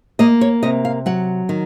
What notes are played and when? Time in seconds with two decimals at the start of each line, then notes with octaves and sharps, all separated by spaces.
0.19 A#3 D#5
0.41 C#5
0.63 C3 D#5
0.85 F5
1.06 F#3 F#5
1.49 D#3